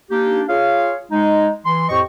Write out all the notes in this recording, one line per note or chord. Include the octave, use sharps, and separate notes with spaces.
A#3 D4 D#4 G4
F4 G#4 C#5 F5
G#3 D#4
E3 C6
F2 A2 G4 C5 D#5 C#6